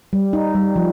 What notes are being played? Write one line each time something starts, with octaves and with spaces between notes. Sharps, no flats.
G3
D#4
G3
F3